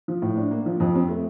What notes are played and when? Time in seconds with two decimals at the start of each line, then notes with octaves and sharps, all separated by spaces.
0.08 F3
0.22 A2
0.37 D4
0.51 A#3
0.66 F3
0.80 F2
0.95 C4
1.09 A3